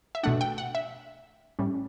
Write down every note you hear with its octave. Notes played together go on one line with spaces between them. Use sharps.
E5
B2 A3 D4 F#5
G5
F#5
E5
A2 G3 C#4